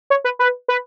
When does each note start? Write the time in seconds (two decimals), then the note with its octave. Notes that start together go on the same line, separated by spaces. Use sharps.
0.10 C#5
0.24 B4
0.39 B4
0.68 B4